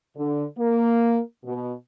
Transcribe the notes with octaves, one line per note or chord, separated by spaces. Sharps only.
D3
A#3
B2